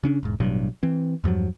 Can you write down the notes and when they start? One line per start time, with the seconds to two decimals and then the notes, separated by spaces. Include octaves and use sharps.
0.03 C#3 C#4 D4
0.23 E1 G#2
0.40 A1 G2 B2 F#3
0.83 E3 C4
1.24 E2 G2 F3 F#3